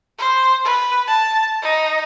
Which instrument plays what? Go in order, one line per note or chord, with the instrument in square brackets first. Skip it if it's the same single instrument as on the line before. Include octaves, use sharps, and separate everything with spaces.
[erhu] C5
B4
A5
D#4